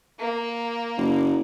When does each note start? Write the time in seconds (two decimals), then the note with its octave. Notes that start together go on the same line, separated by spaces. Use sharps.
0.19 A#3
0.97 F#1